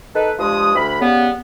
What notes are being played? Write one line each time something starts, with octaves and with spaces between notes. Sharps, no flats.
D#4 A4 B4
G2 F3 G#3 D#6
D2 B5
C#3 G3 B3